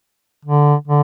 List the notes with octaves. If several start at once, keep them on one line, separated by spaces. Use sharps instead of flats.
D3
D3